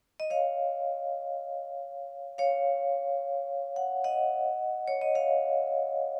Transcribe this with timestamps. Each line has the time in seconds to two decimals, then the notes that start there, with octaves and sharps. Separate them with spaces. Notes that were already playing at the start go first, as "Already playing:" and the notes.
0.20 D#5
0.30 C#5 F5
2.38 C#5 F5
3.76 F#5
4.04 D#5 F#5
4.88 C#5
5.02 D#5
5.15 C#5 F5